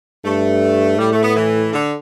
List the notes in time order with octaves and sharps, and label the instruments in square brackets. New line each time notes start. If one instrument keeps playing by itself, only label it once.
[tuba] G2 [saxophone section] A3
[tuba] A2 [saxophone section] G3
[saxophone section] A3
B3
E3
D3